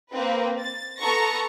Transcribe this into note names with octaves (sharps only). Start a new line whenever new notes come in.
A#3 C4 B4
A6
B3 A4 A#5 C#6 A#6